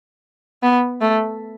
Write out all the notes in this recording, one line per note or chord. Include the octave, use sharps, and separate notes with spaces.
B3
A3